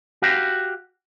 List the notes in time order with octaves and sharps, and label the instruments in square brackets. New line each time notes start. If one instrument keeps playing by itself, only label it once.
[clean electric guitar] F#4 G4 F5